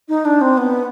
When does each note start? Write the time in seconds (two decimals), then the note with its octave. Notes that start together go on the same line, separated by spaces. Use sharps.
0.08 D#4
0.25 D4
0.41 C4
0.57 B3